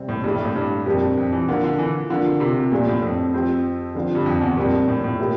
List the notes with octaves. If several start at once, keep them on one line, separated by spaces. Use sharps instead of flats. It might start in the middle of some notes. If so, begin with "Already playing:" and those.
Already playing: C3 G3 C4
A2
G2 E3 A3 E4 G4
G2
A2
G2
F2 A#2 G3 D4 G4
F2
E3
D3 F3 A#3 F4
D3
E3
D3 F3 A#3 D4 F4
C3
A#2 F3 A3 D4 G4
A2
F2
F3 C4 G4
D3 F3 C4
G2
F2
E2
F2 A#2 G3 D4 G4
A2
A2
A#2 A3 E4 G4